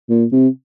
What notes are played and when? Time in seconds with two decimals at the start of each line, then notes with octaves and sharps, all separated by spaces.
0.09 A#2
0.32 C3